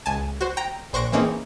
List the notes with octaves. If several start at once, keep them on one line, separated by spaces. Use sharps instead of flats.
C#2 G#5 A5
F#4 C5
G5 A#5 A#6
A#1 C5 C#6 F#6 A#6 D7
E3 A#3 C4 C#4 D#4 G#4